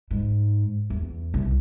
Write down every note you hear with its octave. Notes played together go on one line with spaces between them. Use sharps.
G#2
E2
C2